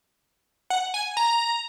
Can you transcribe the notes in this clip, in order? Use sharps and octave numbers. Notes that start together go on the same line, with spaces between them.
F#5
G#5
A#5